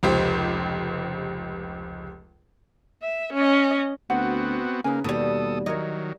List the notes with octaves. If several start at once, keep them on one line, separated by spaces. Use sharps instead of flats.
F1 C#2 G4 C5
E5
C#4 D#5
D2 B3 C4 F#4 F#5
C#3 A#3 D#4 B4 G#5
D#2 B2 G3 A4 D#6
D#3 F#3 E4 A#4 C#5 D#5